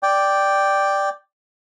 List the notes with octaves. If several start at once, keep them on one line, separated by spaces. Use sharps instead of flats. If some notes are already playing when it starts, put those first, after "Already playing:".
D5 G5